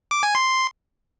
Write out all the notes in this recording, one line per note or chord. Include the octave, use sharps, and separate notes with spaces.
D6
G#5
C6